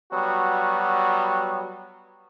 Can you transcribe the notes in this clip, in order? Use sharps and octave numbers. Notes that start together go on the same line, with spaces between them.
F#3 G3 B3 F#4